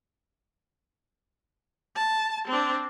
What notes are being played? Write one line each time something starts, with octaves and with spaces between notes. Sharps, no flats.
A5
C4 D4